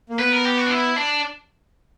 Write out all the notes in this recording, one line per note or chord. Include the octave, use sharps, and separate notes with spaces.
A#3
B3 B4
A#4
G4
F#4
D4
E4
D4